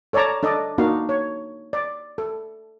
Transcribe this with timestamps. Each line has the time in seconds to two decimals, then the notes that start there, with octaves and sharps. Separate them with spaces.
0.13 A4 C#5 D5 A5 A#5
0.43 D4 A4 D5 D#5
0.78 A#3 D4 D#4 F#4 F5
1.09 C#5
1.73 D5
2.18 A4